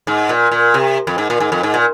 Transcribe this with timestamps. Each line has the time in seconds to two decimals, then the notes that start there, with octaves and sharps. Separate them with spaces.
0.07 G#2
0.29 A#2
0.51 A#2
0.74 C3
1.07 F2
1.18 G#2
1.30 A#2
1.40 G#2
1.52 F2
1.63 G#2
1.74 A#2